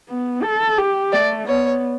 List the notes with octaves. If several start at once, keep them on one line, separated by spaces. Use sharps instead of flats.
B3
A4
G4
A3 D5
B3 C#5